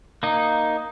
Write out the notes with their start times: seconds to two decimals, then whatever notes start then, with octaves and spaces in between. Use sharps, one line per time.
0.23 A#3 D#4